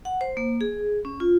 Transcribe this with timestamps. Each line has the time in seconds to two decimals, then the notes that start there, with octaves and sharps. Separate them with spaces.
0.05 F#5
0.21 C5
0.37 A#3
0.61 G#4
1.05 C#4
1.20 F4